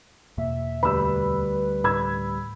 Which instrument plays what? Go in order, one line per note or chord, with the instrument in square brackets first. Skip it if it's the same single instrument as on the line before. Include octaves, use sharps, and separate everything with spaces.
[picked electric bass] E2 B2 A#3 [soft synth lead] E5
[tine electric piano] D2 G3 [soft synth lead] B4 [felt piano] B5 E6
[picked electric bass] A2 [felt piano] B5 E6 G#6